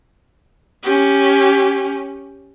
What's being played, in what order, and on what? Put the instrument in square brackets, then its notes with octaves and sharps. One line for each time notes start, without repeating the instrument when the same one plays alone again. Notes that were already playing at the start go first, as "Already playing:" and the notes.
[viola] C#4 G4